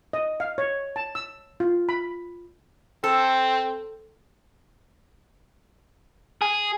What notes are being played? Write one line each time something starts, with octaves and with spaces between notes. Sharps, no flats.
D#5
F5
C#5
A5
E6
F4
B5
C4 A4
G#4